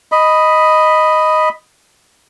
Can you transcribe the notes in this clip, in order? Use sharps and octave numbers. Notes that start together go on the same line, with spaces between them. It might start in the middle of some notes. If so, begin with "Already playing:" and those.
D#5 B5